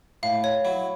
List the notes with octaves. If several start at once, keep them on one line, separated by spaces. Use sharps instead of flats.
A2 F5
C#5
F#3 E4